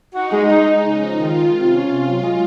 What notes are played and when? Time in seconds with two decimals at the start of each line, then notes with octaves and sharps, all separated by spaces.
0.14 D#4 F#4
0.31 G#3
0.49 D#4
0.66 G#3
0.83 C#3
1.01 F3
1.18 D#3 F4
1.36 G#3
1.52 C3
1.70 C#4 F4
1.87 C3
2.05 F#3
2.22 G#3